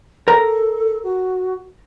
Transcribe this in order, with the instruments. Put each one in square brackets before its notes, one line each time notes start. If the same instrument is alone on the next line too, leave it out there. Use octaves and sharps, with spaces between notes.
[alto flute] A4 [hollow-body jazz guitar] A#4 A#5
[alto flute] F#4